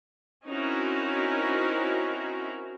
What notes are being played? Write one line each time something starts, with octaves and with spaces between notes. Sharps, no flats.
C4 C#4 D#4 E4 F#4 A#4